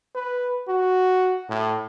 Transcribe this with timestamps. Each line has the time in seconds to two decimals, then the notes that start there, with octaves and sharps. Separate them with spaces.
0.15 B4
0.68 F#4
1.49 A2